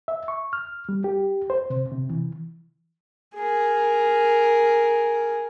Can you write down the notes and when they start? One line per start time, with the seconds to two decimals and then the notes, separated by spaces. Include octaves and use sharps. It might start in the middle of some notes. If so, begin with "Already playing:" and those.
0.08 E5
0.28 C#6
0.53 F6
0.89 G3
1.04 G4
1.50 C5
1.70 C3
1.91 C3
2.10 E3
3.36 G#4 A#4